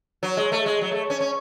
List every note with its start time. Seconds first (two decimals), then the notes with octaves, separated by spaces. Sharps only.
0.23 F#3
0.37 G#3
0.52 A3
0.66 G#3
0.81 F#3
0.91 A3
1.10 C#4
1.20 C#4